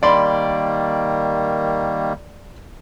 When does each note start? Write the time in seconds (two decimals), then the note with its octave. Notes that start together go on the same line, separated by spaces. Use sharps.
0.03 D#3 G3 A#3 D5 B5 C6